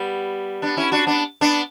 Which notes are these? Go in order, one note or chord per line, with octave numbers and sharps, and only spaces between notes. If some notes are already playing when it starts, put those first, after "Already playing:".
Already playing: G3 B3
B3 D4
C#4 E4
D4 F#4
B3 D4
B3 D4